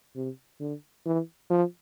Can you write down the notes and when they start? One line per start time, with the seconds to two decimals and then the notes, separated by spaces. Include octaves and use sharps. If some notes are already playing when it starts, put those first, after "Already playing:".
0.16 C3
0.60 D3
1.06 E3
1.50 F3